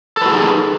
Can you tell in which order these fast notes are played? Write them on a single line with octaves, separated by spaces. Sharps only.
A4 B4 F#4 G#4 D#4